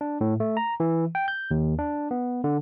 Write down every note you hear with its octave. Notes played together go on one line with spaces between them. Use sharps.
D4
A2
A3
A#5
E3
G5
G6
D#2
D4
B3
D3